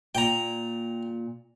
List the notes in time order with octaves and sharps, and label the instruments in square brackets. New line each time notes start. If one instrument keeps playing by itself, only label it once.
[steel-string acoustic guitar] A#2 [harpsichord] G5 A#5